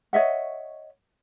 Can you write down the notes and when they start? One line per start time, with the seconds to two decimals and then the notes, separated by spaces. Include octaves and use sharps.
0.13 C#5 D#5 E5 F#5